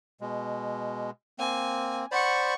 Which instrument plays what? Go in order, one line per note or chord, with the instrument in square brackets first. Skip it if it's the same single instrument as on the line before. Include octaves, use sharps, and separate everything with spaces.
[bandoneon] B2 G#3
[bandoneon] A#3 C4 [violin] G#5
[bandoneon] C5 D5 B5 [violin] F#5 C#6